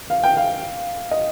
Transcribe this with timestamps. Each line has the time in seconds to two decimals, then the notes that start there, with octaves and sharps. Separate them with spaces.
0.10 F5
0.24 G5
0.37 F5
1.11 D#5